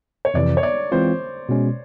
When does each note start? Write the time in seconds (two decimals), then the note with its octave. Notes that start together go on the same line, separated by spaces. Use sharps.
0.25 C#5
0.34 F2 C3 E3 D5
0.57 C#5
0.63 D5
0.92 E3 G#3 C4 F4 C5
1.49 B2 G#3 C#4